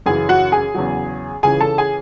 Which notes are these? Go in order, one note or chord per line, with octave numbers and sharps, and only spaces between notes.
F#2 C#3 E3 G#4 G#5
F#4 F#5
G#4 G#5
E2 C#3 F#3
C#2 C#3 E3 G#4 G#5
A4 A5
G#4 G#5